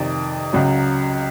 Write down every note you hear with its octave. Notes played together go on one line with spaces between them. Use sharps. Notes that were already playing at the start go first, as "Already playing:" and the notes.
Already playing: F2 C3 D#3 D5
C#2 C#3 F#3